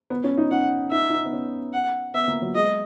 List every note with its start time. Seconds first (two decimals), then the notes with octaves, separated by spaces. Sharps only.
0.10 B3
0.24 C#4
0.37 D#4
0.51 C#4 F#5
0.92 D#4 E5
1.10 D#4
1.25 B3
1.33 C#4
1.73 F#5
2.14 B3 E5
2.28 A#3
2.42 F#3
2.55 G#3 D#5